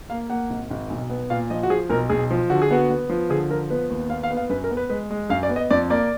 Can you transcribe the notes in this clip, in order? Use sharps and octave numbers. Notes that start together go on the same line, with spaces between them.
A#3 F5
A#3 F#5
G#1
G#1
B1
B3
A#2 F5
F3 D#5
F#4
F3 G#4
B1 A#4
B1 G#4
F3
D3 F#4
G#4
B3 F#4
B3
F3
D3 G#4
F3 A#4
B3 B4
D#2
B3 F5
F5
B3
F5
F#2 B4
A#4
B3
B4
G#3 B4
G#3
F#2 F5
D5
B3
D#5
F2 D5
A#3 D5